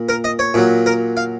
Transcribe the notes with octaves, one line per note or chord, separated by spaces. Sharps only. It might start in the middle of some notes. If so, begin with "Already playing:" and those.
Already playing: A#2
A#4
D#5
C#5
A#2 F#3
A#4
F5